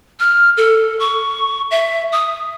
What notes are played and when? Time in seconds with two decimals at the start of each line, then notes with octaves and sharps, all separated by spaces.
0.20 F6
0.57 A4
1.00 C#6
1.71 E5
2.12 D#6